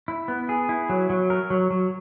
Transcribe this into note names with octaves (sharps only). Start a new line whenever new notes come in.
E4
B3
G#4
E4
F#3
F#3
A#4
F#3
F#3